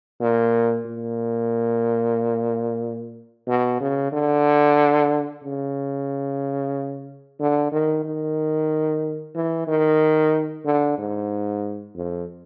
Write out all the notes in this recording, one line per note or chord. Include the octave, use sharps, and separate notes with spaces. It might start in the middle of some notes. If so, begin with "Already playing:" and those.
A#2
A#2
B2
C#3
D3
C#3
D3
D#3
D#3
E3
D#3
D3
G#2
F2